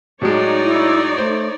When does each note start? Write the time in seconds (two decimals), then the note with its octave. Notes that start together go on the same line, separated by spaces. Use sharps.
0.22 A2 F#3 G#3 D#4 C#5 D5
0.64 E4
1.18 A3 C5